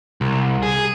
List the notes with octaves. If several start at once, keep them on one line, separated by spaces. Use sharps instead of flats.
C2
G#4